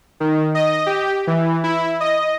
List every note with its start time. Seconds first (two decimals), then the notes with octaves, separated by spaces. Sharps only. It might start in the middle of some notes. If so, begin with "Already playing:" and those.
0.20 D#3
0.55 D#5
0.86 G4
1.27 E3
1.64 E4
2.00 D#5